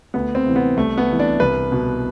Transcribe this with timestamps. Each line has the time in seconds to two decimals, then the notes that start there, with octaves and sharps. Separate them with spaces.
0.14 D2 B3
0.35 C4
0.46 C3 E3
0.56 B3
0.77 C2 A3
0.98 B3
1.08 C3 E3
1.19 D4
1.40 C2 B4
1.72 B2